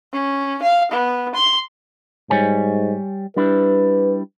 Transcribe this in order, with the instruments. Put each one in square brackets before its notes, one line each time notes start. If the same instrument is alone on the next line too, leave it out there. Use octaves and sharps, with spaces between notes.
[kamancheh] C#4
F5
B3
C6
[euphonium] G#2 [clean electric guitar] G3 C#5 G#5
[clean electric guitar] G3 D4 E4 [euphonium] B4